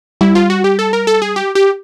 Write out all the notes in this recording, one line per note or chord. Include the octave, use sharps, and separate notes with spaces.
G3 E4
F4
F#4
G4
A4
A#4
A4
G#4
G4
G4